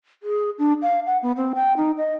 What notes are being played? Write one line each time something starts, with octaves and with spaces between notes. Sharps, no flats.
G#4
D4
F5
F#5
B3
C4
G5
D#4
D#5